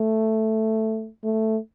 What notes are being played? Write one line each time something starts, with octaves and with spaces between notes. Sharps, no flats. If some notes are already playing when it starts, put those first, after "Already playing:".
Already playing: A3
A3